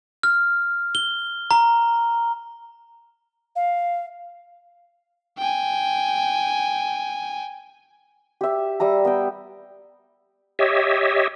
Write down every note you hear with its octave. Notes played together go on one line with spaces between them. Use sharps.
F6
G7
A#5
F5
G5 G#5
G4 E5
G3 E5 A#5
B3 G5
G4 C#5 D#5 E5